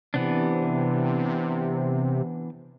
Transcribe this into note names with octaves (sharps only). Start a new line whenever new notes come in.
C3 E3 B3 D4